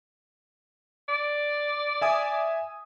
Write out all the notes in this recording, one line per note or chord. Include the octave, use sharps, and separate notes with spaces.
D5
E5 G#5 D#6